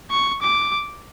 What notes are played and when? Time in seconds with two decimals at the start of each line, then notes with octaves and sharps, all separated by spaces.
0.11 C#6
0.41 D6